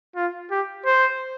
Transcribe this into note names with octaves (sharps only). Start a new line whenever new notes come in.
F4
G4
C5